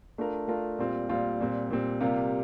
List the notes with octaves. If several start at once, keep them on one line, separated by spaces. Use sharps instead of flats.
A3 D4 F4 A#4
A3 D4 F4 A#4
A#2 G3 C4 F4
A#2 G3 C4 F4
A#2 G3 C4
A#2 G3 C4
C3 G3 A#3 F4